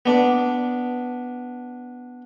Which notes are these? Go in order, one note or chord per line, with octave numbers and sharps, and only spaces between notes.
B3 D4